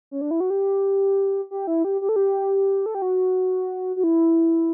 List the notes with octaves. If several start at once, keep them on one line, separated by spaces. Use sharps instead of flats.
C#4
D4
E4
F#4
G4
G4
E4
G4
G4
A4
G4
A4
G4
F#4
F#4
E4